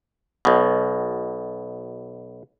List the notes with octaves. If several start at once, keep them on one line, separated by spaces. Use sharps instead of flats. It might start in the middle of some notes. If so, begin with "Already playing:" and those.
B1 B2